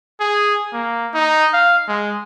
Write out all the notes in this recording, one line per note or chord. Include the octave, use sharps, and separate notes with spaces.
G#4
A#3
D#4
F5
G#3